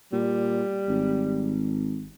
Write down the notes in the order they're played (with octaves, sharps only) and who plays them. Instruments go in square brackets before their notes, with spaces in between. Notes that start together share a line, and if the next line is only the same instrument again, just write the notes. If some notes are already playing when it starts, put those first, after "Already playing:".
[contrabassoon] A#2 [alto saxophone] G3
[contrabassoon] G#1